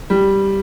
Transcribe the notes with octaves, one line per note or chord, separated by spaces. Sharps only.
G3